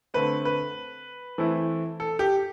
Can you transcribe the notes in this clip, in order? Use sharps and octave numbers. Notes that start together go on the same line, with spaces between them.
D3 A3 C4 B4
B4
E3 A3 C4 E4
A4
G4